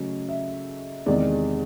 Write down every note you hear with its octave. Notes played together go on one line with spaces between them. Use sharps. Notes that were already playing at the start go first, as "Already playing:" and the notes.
Already playing: C#3 F#3 A3 C#4 D#5
E5
E2 C3 D#3 G#3 D5